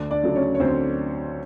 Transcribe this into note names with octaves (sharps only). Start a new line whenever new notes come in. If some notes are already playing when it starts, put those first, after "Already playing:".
Already playing: D2 D4 D5
D4 D5
C#3 F#3 A3
C#4 C#5
C#5
D2 C4 C5